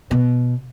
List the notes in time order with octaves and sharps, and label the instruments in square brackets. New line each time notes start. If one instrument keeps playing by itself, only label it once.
[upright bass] B2